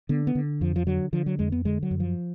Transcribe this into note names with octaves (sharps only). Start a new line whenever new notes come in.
D3 B3
B3
D3
F2 F3
F3
D3 F#3
D3 F3
F#3
F2 G#3
B3
D3 G#3
F#3
F#2
F3